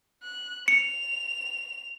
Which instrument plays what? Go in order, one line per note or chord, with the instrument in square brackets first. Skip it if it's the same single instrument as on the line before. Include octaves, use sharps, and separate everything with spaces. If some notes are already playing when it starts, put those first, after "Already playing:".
[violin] F#6
[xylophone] C#7 [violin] F7